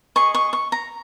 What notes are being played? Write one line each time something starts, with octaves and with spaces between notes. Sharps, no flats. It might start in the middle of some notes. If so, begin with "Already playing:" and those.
G#4 D#5 C#6
C#6
C#6
A#5